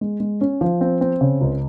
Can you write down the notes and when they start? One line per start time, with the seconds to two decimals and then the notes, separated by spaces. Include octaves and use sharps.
0.01 G#3
0.20 G#3
0.41 C#4
0.61 F3
0.81 C4
1.01 C4
1.21 C#3
1.41 C#2